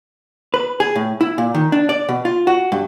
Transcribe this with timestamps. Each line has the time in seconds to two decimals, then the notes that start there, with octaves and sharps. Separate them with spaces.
0.54 B4
0.80 G#4
0.95 A2
1.21 E4
1.38 A#2
1.55 D#3
1.72 D4
1.89 D5
2.09 B2
2.25 F4
2.47 F#4
2.72 G2